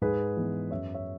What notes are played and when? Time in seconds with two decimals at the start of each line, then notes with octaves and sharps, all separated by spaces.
0.01 G#2 G#4 B4
0.37 E3 B3
0.71 F#2 C#5 E5
0.94 C#5 E5